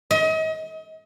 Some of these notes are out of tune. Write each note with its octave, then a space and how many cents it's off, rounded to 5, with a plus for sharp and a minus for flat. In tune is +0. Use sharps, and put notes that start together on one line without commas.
D#5 +35